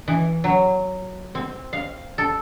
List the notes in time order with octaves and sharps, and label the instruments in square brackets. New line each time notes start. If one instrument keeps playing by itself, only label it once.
[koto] E3
F#3
C4
F5
A4